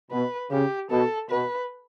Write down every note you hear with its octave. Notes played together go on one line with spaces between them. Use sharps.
B2 B4
C#3 G4
B2 A4
B2 B4